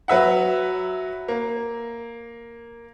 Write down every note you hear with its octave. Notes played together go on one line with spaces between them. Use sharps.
F#3 B4 E5 F#5
A#3